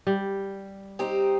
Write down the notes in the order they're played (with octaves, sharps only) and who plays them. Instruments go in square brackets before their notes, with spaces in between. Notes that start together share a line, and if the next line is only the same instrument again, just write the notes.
[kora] G3
[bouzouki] C4 D#4 G4